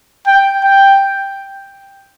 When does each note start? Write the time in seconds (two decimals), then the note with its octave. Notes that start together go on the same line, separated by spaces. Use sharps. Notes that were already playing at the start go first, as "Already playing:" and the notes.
0.27 G5
0.63 G5